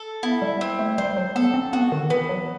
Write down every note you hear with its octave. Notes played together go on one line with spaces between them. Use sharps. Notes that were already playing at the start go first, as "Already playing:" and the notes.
Already playing: A4
B3 E4
G3
C4
A3
G3 C5
F#3
B3 A4
C4
B3 F#4
D#3
E3 B3
F#3